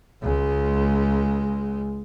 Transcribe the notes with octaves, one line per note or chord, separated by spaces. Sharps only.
C#2 G#3